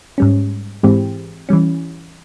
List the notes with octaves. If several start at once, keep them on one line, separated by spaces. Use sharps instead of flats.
G#2 G3 C#4
G#2 E3 G#3 C4 G4
E3 G3 C#4